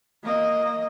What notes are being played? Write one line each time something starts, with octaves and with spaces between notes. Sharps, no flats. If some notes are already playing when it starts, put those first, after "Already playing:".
A#3 D#5